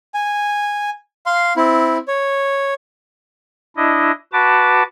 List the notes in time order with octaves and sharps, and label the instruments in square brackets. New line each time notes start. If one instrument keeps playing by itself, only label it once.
[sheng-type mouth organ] G#5
F5 C6
C4 E4
C#5
[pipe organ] D4 E4 D#5
F#4 B4 A5 D6